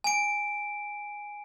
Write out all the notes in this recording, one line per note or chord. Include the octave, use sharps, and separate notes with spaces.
G#5 D7